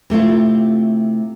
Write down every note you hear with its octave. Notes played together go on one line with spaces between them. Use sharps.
C3 A3 E4 F4